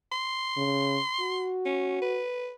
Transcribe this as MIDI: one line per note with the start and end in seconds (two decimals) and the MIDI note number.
0.12 1.52 84
0.57 0.98 49
1.21 2.21 66
1.65 1.98 61
2.02 2.52 71